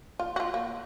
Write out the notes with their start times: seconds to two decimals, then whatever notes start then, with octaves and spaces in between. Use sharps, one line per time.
0.20 F4
0.36 F4 F#4
0.54 A#3